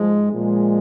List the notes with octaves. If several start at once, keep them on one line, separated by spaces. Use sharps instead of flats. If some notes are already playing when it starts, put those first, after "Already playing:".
Already playing: G#2 F3 G#3
A#2 F3 G#3